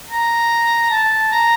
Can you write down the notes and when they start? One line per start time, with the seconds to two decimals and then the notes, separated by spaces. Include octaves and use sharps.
0.09 A#5
0.91 A5
1.31 A#5